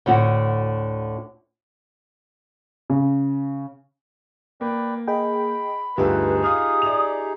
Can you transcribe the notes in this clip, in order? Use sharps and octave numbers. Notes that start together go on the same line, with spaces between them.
D2 A2 D3 F#4
C#3
A#3 B4 D5 G5
G#4 D#5 G5 B5
D2 G2 D#4 F4 G4 G#4 B4 E5
F5 D#6 F6
D5 F7